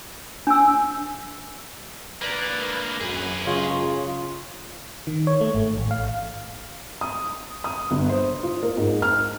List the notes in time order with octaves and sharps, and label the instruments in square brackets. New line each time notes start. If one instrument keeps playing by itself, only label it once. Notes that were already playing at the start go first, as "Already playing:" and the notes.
[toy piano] D4 G#5 E6
[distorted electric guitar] D3 A#3 [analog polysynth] B4 D5 A#5
[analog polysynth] F#2 [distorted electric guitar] G#4 B4
[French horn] C#3 [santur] G#3 F4 C#5
[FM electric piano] D#3
C#5
A3
G#1
A1
F5
[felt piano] D#6
D#6
G1
C5
F4
A#4
G#2
F6